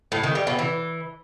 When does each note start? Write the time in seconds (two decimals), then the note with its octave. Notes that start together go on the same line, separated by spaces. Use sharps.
0.12 A2
0.23 D#3
0.35 G3
0.47 B2
0.59 E3